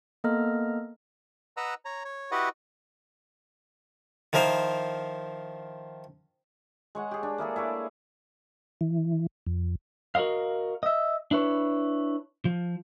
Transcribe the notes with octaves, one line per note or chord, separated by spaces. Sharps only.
A#3 B3 A4 D#5 A#5 F6
B4 D#5 F#5 A#5 E6
C#5 A#5
C#5
E4 F#4 G4 B4 D#5 F#5
D#3 F3 E4 A#4 C5
G#3 C#5 F#5
G4 G#4
D4
A#3 E4 G#4 A4
E4 G#4 C#5 D5
E3
F2
F#4 A#4 C5 D#5 F5
D#5 E5
D4 E4 B4 C#5
F3